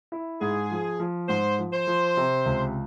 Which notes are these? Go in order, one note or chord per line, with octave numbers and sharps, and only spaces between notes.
E4
G#2 G#4
F3
F3
G#2 C5
F3
C5
F3
C3
C#2